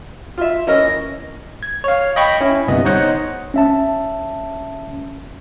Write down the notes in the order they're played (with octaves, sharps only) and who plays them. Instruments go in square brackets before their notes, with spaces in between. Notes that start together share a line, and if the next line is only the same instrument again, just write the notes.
[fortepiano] F4 E5
[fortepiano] E3 C#4 A#4 [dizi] D#5
[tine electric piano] G#6
C#5 F5
D#5 G5 B5 C#6
C#4 E4
G1 C2 C3 B3 D#5
D#4 C5 C#5 D#5 F#5
C#4 E5 A5